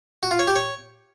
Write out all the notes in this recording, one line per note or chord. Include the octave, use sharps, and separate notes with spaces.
F#4
F4
C#5
G4
C#5